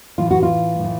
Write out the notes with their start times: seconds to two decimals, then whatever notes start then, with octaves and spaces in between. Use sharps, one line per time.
0.18 A2 E3 F4
0.31 F#4
0.43 F4
0.79 A2 E3